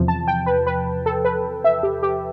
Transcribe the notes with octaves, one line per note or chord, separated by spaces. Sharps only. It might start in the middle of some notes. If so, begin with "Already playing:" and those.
Already playing: E2 C3 F3
A5
G5
B4
B4
A4
B4
E5
G4
G4